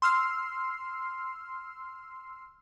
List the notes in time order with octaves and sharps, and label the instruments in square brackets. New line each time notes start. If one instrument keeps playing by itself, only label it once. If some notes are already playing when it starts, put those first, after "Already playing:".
[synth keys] C6 E6 F6 C7